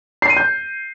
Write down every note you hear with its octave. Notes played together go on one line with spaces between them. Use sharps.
C7
D#7
G6